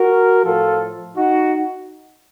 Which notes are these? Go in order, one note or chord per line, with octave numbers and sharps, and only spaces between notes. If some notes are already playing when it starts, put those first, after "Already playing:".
Already playing: F#4 A#4
A2 F3 F4 A4
D#4 F#4